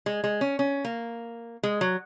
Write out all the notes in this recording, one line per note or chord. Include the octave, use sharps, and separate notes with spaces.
G#3
G#3
C#4
C#4
A#3
G#3
F#3